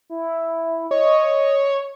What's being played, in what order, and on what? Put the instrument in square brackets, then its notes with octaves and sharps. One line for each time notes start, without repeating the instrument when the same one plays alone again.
[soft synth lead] E4
[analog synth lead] C#5 [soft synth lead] D#5